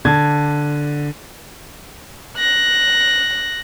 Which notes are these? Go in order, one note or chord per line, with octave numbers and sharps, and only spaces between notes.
D3 A5 G#6
F#6 A#6